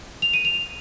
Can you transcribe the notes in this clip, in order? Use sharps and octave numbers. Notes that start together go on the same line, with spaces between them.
F7
D#7
F7